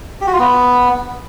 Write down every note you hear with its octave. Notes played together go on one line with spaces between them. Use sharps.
G4
F#4
F4
B3